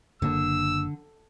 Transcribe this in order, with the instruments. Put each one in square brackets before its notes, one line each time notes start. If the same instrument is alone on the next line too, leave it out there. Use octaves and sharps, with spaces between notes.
[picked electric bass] F#1 A#3 D4 [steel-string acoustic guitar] D3 [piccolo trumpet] E6